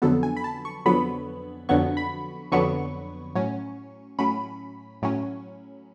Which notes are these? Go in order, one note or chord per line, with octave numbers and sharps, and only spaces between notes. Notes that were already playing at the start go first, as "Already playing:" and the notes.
F2 D3 F#3 B3 A4
G#5
B5
A5
C#6
F2 D3 F#3 B3 B5
F2 D3 F#3 B3 C#6
B5
F2 D3 F#3 B3 C#6
A2 F#3 C#4
A2 F#3 C#4 B5
A2 F#3 C#4